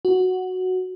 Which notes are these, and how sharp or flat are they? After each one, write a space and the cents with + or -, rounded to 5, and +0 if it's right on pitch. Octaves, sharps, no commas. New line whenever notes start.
F#4 +0